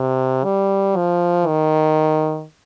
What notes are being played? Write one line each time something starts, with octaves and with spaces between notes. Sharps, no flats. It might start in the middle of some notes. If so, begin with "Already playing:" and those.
Already playing: C3
G3
F3
D#3